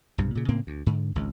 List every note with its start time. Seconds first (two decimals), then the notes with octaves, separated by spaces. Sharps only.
0.18 B1 G2 C3
0.35 A#2 C#3
0.49 A2 C#3 A#3 C4
0.67 D2
0.86 G#2 D3
1.15 G#1 C#2